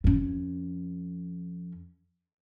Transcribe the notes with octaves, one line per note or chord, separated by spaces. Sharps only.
F2 C#4